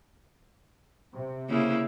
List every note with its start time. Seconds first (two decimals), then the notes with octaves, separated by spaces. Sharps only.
1.15 C3
1.49 C#3 A#3 E4